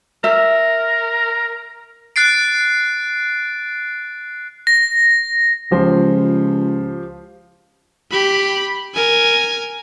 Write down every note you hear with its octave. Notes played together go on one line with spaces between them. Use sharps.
A#4 E5
F#6 A6 C7 D7
A#6
C#2 F3 G4 C5
G4 B5
A#4 G#5